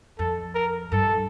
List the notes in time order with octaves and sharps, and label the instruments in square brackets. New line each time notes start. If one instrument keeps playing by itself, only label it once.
[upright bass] F2 [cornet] A4
[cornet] A#4
[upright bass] G2 [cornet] A4